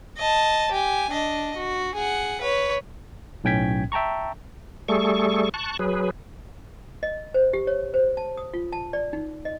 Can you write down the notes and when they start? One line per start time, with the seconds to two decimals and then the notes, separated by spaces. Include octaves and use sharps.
0.18 D#5 A5
0.71 G4 G#5
1.11 D4 D#5
1.57 F#4
1.95 G#4 F#5
2.41 B4 C#5
3.44 B1 A2 C#4 G5 G#6 B6
3.92 E5 G5 A5 A#5 C#6
4.88 G3 A3 G#4 A4 C#6
5.54 A5 C#6 F#6
5.79 F#3 G#4 B4
7.03 D#5
7.34 C5
7.53 G4
7.67 C#5
7.94 C5
8.17 A5
8.37 D#6
8.54 F4
8.73 A5
8.93 D5
9.13 D#4
9.45 D#5